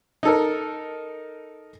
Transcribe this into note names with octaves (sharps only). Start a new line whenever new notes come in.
D#4 A4 A#4